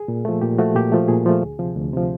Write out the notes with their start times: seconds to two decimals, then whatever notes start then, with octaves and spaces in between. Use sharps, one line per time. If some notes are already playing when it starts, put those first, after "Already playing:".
Already playing: G#4
0.08 A#2
0.25 F3 A3
0.41 A#2 G4
0.58 F3 A3 F#4
0.75 A#2 G4
0.92 F3 A3
1.08 A#2 G#4
1.26 F3 A3
1.42 D2
1.59 C3 F3
1.75 D2
1.93 C3 F3